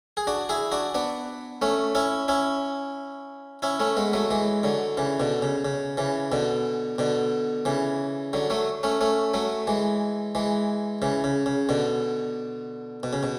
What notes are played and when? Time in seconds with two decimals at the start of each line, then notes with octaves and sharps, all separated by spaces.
0.17 G#4
0.27 D4 F#4
0.49 E4 G#4
0.72 D4 F#4
0.94 B3 D4
1.62 A3 C#4
1.95 C#4 E4
2.28 C#4 E4
3.62 C#4 E4
3.80 A3 C#4
3.97 G#3 B3
4.13 F#3 A3
4.30 E3 G#3
4.63 D3 F#3
4.97 C#3 E3
5.20 B2 D3
5.42 C#3
5.65 C#3
5.97 C#3 E3
6.32 B2 D3
6.98 B2 D3
7.65 C#3 E3
8.33 D3 F#3
8.50 F#3 A3
8.83 A3 C#4
9.01 A3 C#4
9.34 F#3 A3
9.67 E3 G#3
10.35 E3 G#3
11.02 C#3 E3
11.24 C#3
11.46 C#3
11.69 B2 D3
13.03 B2
13.13 C#3
13.23 B2